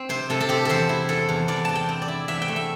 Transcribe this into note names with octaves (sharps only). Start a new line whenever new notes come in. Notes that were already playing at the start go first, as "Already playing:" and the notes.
Already playing: C4
C3 C5
C3 A4
A4
C4 G4
E2 A4 C5
E4
E2 A4
E2
E2 D5
E2 A5
G5
C4
D5
E4
E2 E5
G5
A3
E5